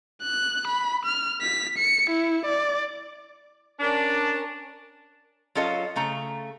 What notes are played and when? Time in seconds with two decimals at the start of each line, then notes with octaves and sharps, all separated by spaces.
0.22 F#6
0.67 B5
1.05 F6
1.42 B6
1.78 C#7
2.10 E4
2.46 D5
3.79 C#4 D4 A#4
5.55 F#3 C#4 F4 A4 D#5
5.96 C#3 A3 A#5